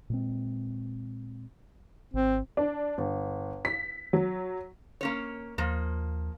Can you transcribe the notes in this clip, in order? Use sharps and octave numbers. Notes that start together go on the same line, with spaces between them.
A#2 G#3 C4
G#1 C4
D4
G1
B6
F#3
A#3 C#4 C#5
D#2 F3 A#3